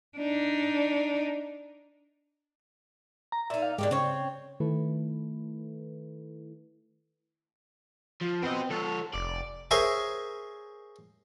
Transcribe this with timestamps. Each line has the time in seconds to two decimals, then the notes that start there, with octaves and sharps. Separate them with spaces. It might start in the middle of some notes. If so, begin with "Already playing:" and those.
0.18 D4 D#4
3.32 A#5
3.50 A#2 D#4 E5
3.62 F5
3.78 G#2 D3 D#3 G4
3.91 C#3 C4 C#5
4.60 D#3 A3 E4 A4 B4
8.21 F3
8.42 B3 C4 D#5
8.70 F3 A4 C#5
9.14 F1 D5
9.71 G#4 A#4 C5 C#5 E5 G#5